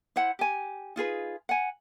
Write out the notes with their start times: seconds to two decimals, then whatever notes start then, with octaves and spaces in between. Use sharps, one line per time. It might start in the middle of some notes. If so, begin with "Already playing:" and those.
0.16 E4 C5 F#5
0.39 G4 G#5
0.96 D#4 F4 G#4 B4
1.49 F#5 G#5